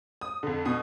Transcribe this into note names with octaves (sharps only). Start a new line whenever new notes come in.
D#6
F2 D3
B2 D#6